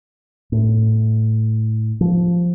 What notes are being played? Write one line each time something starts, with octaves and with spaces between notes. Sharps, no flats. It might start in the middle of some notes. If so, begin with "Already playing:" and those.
A2
F3